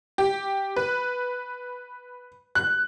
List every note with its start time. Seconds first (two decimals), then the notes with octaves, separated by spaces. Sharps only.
0.18 G4
0.76 B4
2.55 F#6